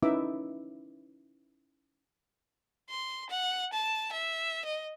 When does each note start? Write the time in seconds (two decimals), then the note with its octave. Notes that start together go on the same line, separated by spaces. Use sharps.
0.02 C#4 D#4 E4 B4 E5 D6
2.90 C6
3.30 F#5
3.73 A5
4.12 E5
4.65 D#5